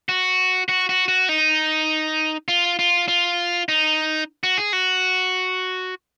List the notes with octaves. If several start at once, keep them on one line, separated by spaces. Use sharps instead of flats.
F#4
F#4
F#4
F#4
D#4
F4
F4
F4
D#4
F#4
G#4
F#4